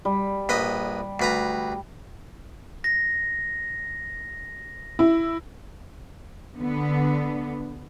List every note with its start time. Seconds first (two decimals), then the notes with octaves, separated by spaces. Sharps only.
0.05 G3
0.49 A#1 B4 D#5
1.20 D2 B4 A#5
2.84 A#6
4.99 E4
6.59 D3 B3